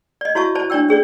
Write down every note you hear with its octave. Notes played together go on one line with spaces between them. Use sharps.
D5 D#5
E4 F#4 C#5 E5 A5 C#6
C5 D5 A5
D4 C#5 D5 G5 E6
C#4 G#4 C#5 D5